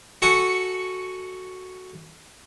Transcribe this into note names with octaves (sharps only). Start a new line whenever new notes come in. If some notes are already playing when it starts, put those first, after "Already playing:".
F#4 A4 F#5 G#5 C#6